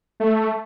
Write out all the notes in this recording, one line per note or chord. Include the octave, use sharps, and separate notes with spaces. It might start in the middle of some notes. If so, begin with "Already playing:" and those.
A3